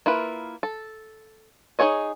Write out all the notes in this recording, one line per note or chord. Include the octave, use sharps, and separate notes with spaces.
A#3 E4 F4 B4
A4
D#4 F#4 G#4 C#5 D#5